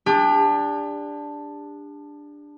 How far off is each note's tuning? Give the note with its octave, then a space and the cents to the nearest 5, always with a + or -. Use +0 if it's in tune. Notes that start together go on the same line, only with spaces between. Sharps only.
D4 +0 G4 +40